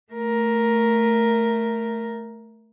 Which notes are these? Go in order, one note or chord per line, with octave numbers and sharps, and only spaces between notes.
A3 A#4